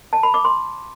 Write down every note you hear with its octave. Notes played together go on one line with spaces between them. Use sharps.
A5
B5
D6
C6